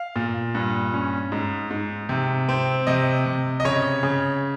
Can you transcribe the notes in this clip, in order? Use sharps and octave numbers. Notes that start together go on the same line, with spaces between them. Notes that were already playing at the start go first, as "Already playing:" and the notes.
Already playing: F5
A#2
G2
C#4
G#2
G#2
C3
C4
C3 D#5
C3
D#5
C#3 C#5
C#3